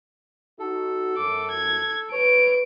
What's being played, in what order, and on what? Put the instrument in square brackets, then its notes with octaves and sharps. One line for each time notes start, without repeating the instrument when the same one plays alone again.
[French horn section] D#4 F#4 [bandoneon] A4
[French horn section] F#2 [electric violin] D6
[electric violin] G#6
[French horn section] B4 [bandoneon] C#5 [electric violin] D7